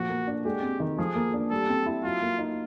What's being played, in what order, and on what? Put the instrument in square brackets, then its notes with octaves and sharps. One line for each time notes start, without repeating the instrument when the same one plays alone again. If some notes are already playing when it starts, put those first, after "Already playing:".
Already playing: [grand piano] A#2 F3 [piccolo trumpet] F#4
[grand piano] A#3
D4
[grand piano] G#3 [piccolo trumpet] G4
[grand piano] C4
D#3
[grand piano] F3 [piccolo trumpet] G#4
[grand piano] A#3
D4
[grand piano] G3 [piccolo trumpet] A4
[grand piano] C4
E4
[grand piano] F#3 [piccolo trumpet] F4
[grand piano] A#3
D#4